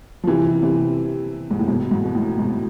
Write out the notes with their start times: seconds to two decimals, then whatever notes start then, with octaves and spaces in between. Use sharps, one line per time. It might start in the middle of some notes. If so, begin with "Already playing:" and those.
0.23 F3
0.27 C3 E3
0.63 C3 E3
1.51 G#2
1.59 A2
1.67 G#2 B2
1.91 G#2
2.05 B2
2.15 A2
2.38 G#2 B2